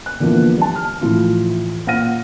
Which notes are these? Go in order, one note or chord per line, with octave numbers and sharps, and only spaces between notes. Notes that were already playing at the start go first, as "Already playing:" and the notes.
F#6
D3 E3 F3 A#3 B3 D4
G3 A5
F6
A2 E3 F3 E4 F4
A#2 F5 F#5 F6 A#6 D#7